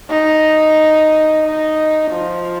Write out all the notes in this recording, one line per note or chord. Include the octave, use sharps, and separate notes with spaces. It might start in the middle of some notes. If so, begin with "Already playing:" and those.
D#4
D#4
F3